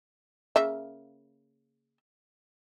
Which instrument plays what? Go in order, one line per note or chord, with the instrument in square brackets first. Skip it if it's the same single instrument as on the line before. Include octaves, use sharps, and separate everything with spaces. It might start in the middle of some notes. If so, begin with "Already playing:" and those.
[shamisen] C#3 A#3 E5